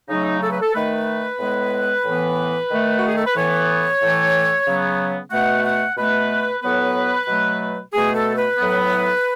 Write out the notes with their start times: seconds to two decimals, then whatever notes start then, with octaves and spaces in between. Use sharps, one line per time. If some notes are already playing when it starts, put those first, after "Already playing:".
0.09 C#3 F#3 A3 D#4
0.41 A4
0.51 B4
0.61 A4
0.74 D#3 A3 B4
1.39 A2 G#3 B3
2.05 A2 E3 B3
2.70 D#3 A3
2.98 F#4
3.07 G#4
3.16 A4
3.26 B4
3.36 A2 E3 B3 C#5
4.01 A2 E3 A3
4.66 C#3 F#3 B3
5.31 B2 A3 F#5
5.64 F#5
5.97 B2 A3 B4
6.62 A2 F#3 B3 B4
7.27 B2 F#3 A3
7.93 B2 A3 G#4
8.14 A4
8.37 B4
8.58 A2 F#3 B3